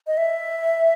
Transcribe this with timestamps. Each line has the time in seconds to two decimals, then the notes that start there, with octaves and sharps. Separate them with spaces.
0.07 D#5
0.17 E5